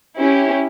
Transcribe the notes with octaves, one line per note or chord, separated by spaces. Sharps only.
C#4 E4 G4